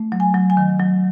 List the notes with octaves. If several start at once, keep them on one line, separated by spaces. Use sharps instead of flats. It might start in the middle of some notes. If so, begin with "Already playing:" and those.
Already playing: A3
F#3
G#5
F#3
G#5
D#3
F#3